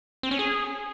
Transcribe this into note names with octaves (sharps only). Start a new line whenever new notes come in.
C4
C#4
G#4